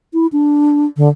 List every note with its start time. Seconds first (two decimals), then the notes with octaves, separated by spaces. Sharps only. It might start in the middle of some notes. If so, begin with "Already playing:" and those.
0.14 E4
0.32 D4
0.97 D3